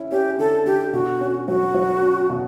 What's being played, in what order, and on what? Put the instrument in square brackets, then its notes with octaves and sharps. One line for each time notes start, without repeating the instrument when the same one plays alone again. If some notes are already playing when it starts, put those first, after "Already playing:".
Already playing: [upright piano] C#4 E4
[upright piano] C#4 [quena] G4
[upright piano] D3 [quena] A4
[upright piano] D3 [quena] G4
[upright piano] B2 [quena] F#4
[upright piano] C#4
[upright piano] F#3 [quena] F#4
[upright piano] F#3
C#4
B2